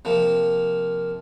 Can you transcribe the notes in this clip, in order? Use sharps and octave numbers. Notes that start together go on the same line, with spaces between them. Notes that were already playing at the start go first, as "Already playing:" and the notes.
C3 F3 A#3